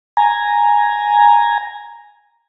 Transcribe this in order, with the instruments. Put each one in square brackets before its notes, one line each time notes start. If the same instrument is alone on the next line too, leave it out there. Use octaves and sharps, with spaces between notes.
[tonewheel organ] G#5 A#5